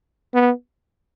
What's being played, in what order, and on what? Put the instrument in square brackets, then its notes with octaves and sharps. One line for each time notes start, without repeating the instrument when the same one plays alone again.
[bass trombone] B3